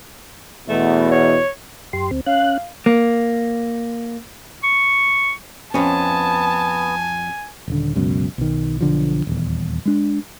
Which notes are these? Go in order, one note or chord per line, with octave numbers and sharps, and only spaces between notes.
E2 B2 A3
C#5
F#2 G4 C6
D2 C4
C#4 F5 F#6
A#3
C#6
F2 B3 C#4 G#5 A5
D#1 D3
C#2 F#2 B2
B1 D#3
B1 D3 F3
D#1 E2
G#3 D4